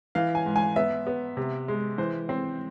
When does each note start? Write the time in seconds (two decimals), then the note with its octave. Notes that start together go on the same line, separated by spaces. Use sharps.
0.15 E3 F5
0.35 G#5
0.46 G#2
0.56 G#5
0.76 B3 E5
1.07 B3
1.37 C3
1.68 G#3
1.98 E3 C5
2.29 C4